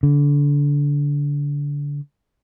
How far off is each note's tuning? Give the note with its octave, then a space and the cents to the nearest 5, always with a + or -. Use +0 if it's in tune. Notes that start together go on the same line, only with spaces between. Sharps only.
D3 -25